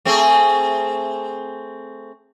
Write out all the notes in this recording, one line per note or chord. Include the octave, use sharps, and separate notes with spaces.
A3 C4 G#4